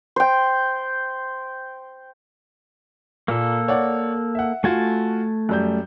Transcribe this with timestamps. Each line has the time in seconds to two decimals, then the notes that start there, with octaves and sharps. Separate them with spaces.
0.16 C5 G5
3.28 A#2 A#3 A4
3.68 C#5 D5 F#5
4.35 E5 F#5
4.64 A3 F4 F#4 G#5 A5
5.49 F#2 G3 G6